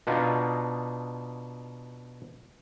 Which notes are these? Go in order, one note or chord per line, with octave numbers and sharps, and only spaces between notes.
B2 D4 D#4 F4